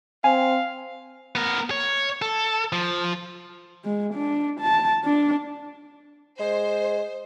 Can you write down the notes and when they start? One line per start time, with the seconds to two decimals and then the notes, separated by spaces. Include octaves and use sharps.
0.24 C4 F5 G#5
1.35 B3 A#4
1.71 C#5
2.22 A4
2.72 F3
3.85 G#3
4.14 D4
4.60 A5
5.04 D4
6.39 G#3 C5